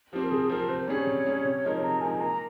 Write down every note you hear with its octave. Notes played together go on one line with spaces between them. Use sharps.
F3 C4 G4
A#4
C3 G#4
F3 C4 A#4
C3 C5
G3 C#4 G#4 C#5
C3
G3 C#4 G#4
C3
F3 G#3 D#4 A#4
C3 A#5
F3 G#3 D#4 A#4 G#5
A#3 A#5